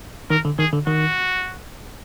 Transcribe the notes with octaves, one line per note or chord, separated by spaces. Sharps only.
D#3 A#4
D3
D#3 G#4
D3
D#3 F#4